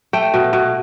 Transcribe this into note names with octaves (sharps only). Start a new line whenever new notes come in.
A3 G5
B2
B2